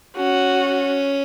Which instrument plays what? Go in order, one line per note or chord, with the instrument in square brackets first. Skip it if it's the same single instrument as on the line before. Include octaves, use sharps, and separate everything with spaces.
[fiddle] C#4 [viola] F#4